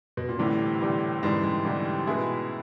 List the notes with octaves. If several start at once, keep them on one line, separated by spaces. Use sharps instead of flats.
B2
A#2
D2 A2 C3 E3 G3
D2 C3 E3 G3
D2 G#2 C3 E3 G3
G#2
D2 C3 E3 G3
B2 G#3 B3 E4 G#4